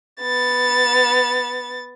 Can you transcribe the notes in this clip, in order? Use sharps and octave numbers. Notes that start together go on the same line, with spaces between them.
B3 A6